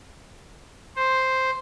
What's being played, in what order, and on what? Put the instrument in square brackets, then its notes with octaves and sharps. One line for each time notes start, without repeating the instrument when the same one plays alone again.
[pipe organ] C5